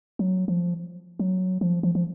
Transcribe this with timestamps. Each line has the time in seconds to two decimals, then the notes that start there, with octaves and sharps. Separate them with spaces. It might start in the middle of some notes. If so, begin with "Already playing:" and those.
0.19 F#3
0.48 F3
1.19 F#3
1.61 F3
1.83 F3
1.95 F3